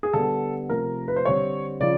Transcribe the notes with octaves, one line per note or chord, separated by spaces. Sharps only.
G#4
D3 G3 B3 A4
C3 F3 A3 C4 A#4
B4
C5
D3 G3 C4 C#5
C#3 F3 D5